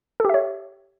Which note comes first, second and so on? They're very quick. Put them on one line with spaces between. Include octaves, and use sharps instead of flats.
A4 G4 E5 C#5